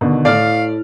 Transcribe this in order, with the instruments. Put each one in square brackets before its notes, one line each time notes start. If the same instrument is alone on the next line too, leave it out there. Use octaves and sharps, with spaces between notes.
[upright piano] B2 D3 D#3
[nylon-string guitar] A2 [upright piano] A3 F6 [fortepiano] D5 [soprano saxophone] F5